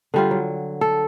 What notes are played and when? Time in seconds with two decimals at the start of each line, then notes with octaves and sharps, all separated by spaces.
0.14 D3 G3 F4
0.31 F#3
0.81 A4